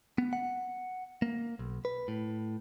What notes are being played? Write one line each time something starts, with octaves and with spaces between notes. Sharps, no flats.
B3
F#5
A#3
B1
B4
A2